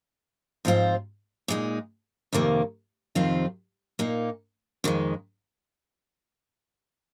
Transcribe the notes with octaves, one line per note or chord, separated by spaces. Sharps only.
G#2 F3 C4 F4 C5
A#2 G#3 D#4
F2 C3 D#3 A#3
F2 C3 D#3 C4 F4
A#2 A#3 D#4
F2 D#3 G#3